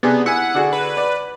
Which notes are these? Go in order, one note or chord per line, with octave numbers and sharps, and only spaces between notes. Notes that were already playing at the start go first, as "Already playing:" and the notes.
C3 B3 D4 G#4
E4 F#5 G#5
D3 F#4 G#4
B4
D5